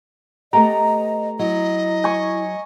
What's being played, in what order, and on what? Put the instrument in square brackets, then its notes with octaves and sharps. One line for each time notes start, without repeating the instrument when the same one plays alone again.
[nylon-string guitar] A3 B3 G4 [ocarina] D#5 [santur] A#5
[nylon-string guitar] F#3 [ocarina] E4 [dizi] D#5
[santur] G#5 C#6